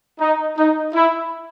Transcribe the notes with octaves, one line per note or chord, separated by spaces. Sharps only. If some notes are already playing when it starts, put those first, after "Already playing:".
D#4
D#4
E4